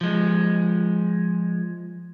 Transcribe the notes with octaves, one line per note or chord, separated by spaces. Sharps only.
F3 G#3